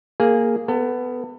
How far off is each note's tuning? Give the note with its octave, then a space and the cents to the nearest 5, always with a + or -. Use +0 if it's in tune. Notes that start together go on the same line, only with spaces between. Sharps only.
A#3 -5 G#4 +0
B3 +15 A4 +40